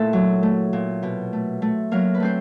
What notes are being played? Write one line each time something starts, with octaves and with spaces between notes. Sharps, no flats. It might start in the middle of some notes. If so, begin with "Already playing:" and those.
Already playing: A#2 A3 E4 A4
F#3
A3
A#2
B2
A3
A3
F#3 A#3 A#4
B4
A3 C4 C5